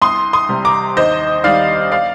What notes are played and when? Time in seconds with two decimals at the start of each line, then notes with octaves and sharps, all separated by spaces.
0.02 C2 C6 D#6
0.33 C6 D#6
0.49 C3 G3
0.65 A#5 D6
0.97 D#2 C5 D#5
1.44 D#3 G3 D5 F5
1.91 D5 F5